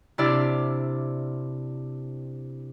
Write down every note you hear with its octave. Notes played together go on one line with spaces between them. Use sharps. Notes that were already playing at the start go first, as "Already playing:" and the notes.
C3 D4 E4 D5 E5 F6